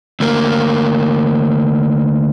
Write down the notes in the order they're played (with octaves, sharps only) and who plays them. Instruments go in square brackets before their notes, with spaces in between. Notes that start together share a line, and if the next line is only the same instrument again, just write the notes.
[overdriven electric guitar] D2 A#3